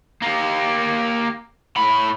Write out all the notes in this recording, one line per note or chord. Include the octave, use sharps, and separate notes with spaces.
A#3 G4
A2 B5